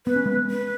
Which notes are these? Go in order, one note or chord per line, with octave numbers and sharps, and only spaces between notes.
B3 B4
C#4
G#3 B3
B4